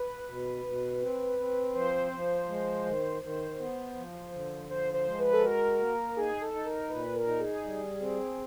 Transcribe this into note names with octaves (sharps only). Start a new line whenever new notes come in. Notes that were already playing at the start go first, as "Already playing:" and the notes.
Already playing: B4
B2
B2
C4
C4
F3 C5
F3
G#3
D#3
D#3 C5
B3
F3
D3
F3 C5
C5
G#3
B4
A4
F#4 A#4
A#3
D#4 G#4
A4
D#4
A#4
A#2 B4
A#4
D#4
G#4
G3
C4